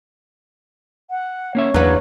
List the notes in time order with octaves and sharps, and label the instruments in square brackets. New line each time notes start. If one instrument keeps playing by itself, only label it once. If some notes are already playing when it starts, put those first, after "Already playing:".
[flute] F#5
[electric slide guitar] A#3 C#4 E5 [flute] C#5
[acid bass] E2 [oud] F#3 B4 [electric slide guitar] D4 F5 F#5